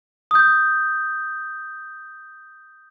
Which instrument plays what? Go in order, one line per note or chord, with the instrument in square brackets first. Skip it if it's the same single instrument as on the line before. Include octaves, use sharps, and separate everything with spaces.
[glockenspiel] D#6 G6